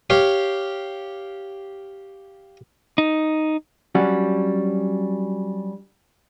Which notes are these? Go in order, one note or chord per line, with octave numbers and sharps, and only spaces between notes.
G4 C#5 F5
D#4
F#3 G3 C#4 D4 F#4